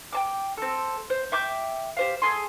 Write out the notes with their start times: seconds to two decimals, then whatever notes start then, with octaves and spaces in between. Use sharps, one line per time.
0.13 G5 A5 D6
0.57 C4 A4
1.10 C5
1.32 E5 G5 D6 G6
1.97 G4 C5 F5
2.22 G#4 A4 G#5 C6